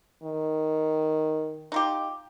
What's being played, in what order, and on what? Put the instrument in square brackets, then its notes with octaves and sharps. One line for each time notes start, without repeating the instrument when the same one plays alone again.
[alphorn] D#3
[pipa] D#4 F4 G4